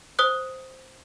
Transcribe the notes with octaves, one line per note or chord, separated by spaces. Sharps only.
C5 D#6 F#6